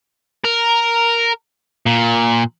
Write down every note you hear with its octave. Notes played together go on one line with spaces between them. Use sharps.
A#4
A#2